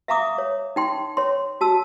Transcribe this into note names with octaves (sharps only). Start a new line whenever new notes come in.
E5 F5 A#5 D6 D#6
C#5
D#4 G5 C6
C#5 C6
F#4 A5 E6